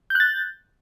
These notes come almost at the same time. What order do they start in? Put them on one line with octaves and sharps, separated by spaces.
G6 F#6 A6